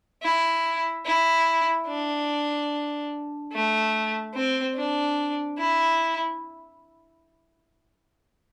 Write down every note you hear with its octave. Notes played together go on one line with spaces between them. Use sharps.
E4
E4
D4
A3
C4
D4
E4